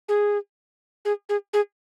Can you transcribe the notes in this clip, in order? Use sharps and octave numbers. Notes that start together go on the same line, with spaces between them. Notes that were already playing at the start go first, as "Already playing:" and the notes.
G#4
G#4
G#4
G#4